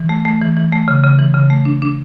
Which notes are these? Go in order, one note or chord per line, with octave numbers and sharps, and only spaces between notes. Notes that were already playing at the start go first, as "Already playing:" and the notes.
Already playing: E3
A3
A3
E3
E3
A3
C#3
C#3
E3
C#3
A3
D4
D4